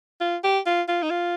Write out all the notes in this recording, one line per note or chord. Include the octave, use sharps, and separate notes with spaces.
F4
G4
F4
F4
D#4
F4